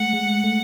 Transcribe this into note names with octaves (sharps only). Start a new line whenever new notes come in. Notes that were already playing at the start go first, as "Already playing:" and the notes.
Already playing: G#3 A3 F#5
G#3
A3